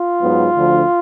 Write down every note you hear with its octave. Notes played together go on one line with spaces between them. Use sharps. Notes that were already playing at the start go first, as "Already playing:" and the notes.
Already playing: F4
G#2 F#3 B3
D2 D3 F3